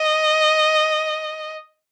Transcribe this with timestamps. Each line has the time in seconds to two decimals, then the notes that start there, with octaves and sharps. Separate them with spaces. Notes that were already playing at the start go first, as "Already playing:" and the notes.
Already playing: D#5